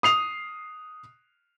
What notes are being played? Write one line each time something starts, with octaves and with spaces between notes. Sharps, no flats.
D#6 C7 F7